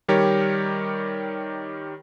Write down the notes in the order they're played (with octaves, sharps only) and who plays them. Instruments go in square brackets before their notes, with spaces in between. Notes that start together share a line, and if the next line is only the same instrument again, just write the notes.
[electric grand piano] D#3 G3 G4 A#4 C#5